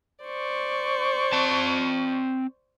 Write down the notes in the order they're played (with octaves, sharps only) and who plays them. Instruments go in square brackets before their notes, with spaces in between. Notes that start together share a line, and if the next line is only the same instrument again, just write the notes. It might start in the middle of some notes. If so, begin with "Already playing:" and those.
[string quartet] C5 D5 C#6
[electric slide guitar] C4 A5